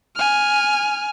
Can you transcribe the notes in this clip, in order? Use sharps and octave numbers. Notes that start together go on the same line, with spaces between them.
G#5 F6